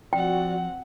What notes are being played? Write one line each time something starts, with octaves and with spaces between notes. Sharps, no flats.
F3 C4 F#4 D5 F#5 G5